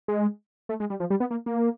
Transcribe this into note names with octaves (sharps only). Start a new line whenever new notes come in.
G#3
A3
G#3
G3
F3
G3
B3
A#3
A#3